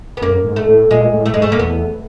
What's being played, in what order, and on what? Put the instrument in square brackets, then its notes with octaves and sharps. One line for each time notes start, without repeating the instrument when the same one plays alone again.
[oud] B3
[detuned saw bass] F#2 [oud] A#3
[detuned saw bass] G#2
[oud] A3
[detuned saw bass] A2
[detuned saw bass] A#2 [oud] G#3
[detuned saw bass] A2
[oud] A3
[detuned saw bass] G#2 [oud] G#3
[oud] A3
A#3
[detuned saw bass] E2 [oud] B3